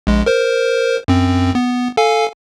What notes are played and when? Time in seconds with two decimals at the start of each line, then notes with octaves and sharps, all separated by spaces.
0.07 A#1 G#3
0.26 A#4 C5
1.08 F#2 C4
1.55 B3
1.97 A4 F5 G#5